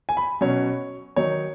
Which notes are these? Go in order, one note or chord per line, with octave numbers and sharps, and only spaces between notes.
G#5
B5
B2 F#3 C#4 C#5
D#3 F#3 D#4 C#5